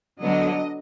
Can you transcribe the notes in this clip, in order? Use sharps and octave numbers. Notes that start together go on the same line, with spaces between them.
D3 F#3 B3 D4 D#5